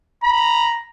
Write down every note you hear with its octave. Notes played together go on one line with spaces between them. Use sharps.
A#5 B5